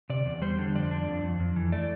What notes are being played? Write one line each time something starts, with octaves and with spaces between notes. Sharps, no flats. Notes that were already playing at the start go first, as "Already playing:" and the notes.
C3 D5
E2
G3 C5
D3
F2 D5
D4
F2
F2
F2
E3
A3 D5